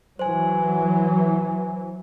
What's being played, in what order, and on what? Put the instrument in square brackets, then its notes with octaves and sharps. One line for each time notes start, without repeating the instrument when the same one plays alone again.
[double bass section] E3 F#3 [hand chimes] C5 G#5